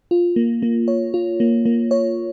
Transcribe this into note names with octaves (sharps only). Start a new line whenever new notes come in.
F4
A#3
A#3
C#5
F4
A#3
A#3
C#5